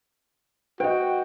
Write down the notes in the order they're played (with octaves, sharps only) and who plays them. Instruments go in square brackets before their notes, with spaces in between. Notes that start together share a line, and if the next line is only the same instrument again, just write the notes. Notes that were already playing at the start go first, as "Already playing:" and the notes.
[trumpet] F#4 [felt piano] B4 D#5 [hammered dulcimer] G5